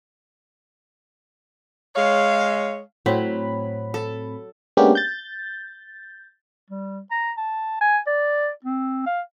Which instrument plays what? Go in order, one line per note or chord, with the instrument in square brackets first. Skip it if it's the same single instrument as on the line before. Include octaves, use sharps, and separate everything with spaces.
[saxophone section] G#3 C#5 [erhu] F5
[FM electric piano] A2 C4 B5 [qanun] F#3
[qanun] A4
[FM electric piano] G#3 A#3 B3 C#4 D4 G4
G6 A6
[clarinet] G3
A#5
A5
G#5
D5
C4
F5